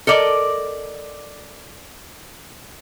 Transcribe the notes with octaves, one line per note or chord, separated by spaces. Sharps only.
A4 A#4 D5 D#5